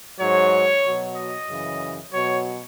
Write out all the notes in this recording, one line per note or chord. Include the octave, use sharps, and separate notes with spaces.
G#2 F#3 C#5
B2 F#3
D#5
F#2 C#3 E3
B2 F#3 C#5